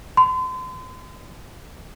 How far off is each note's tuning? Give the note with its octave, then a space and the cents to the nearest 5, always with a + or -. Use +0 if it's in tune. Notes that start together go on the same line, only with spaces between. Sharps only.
C6 -40